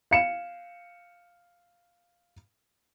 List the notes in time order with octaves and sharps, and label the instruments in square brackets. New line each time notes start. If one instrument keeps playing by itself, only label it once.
[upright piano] F5 C#7 E7